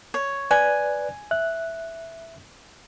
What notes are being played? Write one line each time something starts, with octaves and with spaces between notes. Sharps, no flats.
C#5
B4 D5 G#5 F#6
E5 F#6